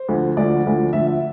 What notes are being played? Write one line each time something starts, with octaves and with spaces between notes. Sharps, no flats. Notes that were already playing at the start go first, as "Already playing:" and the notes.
Already playing: C5
D2 D3 F3
D2 D3 F3 D5
D2 D3 F3
D2 D3 F3 E5
E5